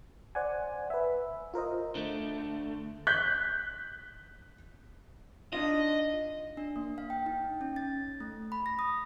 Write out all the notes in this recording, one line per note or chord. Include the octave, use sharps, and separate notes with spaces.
C5 D5 F#5 G#5
B4 E5
F4 A#4 C5 D#5
D3 A3
F#6 G6 B6
D4 D#4 F4 D#5
D4
A#3
F5
G5
D#4
C#4
A6
A3
B5
A#6
D#6